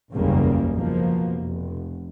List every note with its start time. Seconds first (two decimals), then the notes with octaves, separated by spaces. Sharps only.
0.12 F#1 B1 E2 C#3 G3 A#3
0.75 B2 F3 A#3
1.29 F1